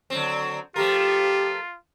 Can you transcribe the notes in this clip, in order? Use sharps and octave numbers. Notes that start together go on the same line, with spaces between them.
D3 F#3 C4
F3 A3 F4 G4 A#4